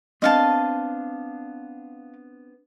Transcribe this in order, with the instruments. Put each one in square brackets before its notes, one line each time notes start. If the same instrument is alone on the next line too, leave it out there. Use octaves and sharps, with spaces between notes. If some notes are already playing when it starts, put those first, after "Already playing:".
[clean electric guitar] B3 C4 D4 [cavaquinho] D#5 F5 A5